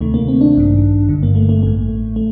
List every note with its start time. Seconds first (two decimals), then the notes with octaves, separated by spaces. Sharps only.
0.01 D2 C3 D#3 A3
0.14 A#3
0.28 C4
0.41 D4
0.55 A1 G2 D#3
1.09 G1 G2 D3
1.23 A#3
1.35 A3
1.49 A3
1.63 A1 A2 A3
2.16 A3